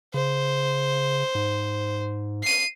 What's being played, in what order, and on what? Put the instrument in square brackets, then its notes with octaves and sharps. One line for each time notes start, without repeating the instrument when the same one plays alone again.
[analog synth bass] C#3 [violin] C5
[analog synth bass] G#2
[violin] C7 D#7